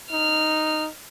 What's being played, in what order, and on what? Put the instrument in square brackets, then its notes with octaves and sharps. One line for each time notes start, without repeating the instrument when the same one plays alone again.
[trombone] D#4 [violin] F6